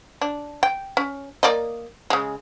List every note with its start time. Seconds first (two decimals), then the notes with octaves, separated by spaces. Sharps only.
0.22 D4
0.63 G5
0.97 C#4
1.43 A#3 D5 D#5
2.10 C#3 G#3